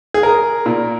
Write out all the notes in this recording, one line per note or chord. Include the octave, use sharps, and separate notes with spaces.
G#4
A#4
A#2